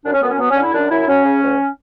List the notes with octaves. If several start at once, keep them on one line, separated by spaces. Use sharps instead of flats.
F#2 D4
C#4
F#2 B3
C#4
F#3 B3
C#4
D3
E4
F#2 D4
F#2 E4
F#3 C#4
C#3
D2